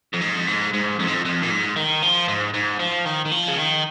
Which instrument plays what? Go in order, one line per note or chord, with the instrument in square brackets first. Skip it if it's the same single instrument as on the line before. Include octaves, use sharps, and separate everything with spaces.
[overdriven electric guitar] F2
G#2
F2
G#2
G#2
F2
G#2
F2
F2
A#2
G#2
D#3
F3
G#2
G#2
F3
D#3
D#3
F3
C#3
D#3